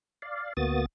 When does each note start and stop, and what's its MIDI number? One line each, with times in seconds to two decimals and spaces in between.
0.22 0.53 74
0.22 0.53 77
0.57 0.86 38
0.57 0.86 58
0.57 0.86 59
0.57 0.86 66
0.57 0.86 87
0.57 0.86 93